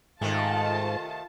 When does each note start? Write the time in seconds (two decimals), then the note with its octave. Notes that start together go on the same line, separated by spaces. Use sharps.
0.21 G#2 C3 D#3 A3 F4 A5